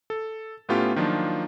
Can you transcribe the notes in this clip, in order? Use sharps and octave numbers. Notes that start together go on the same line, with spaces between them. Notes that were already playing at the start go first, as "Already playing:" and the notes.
A4
A2 A3 B3 C#4 F4 G4
D#3 F3 F#3 A#3 D4 F4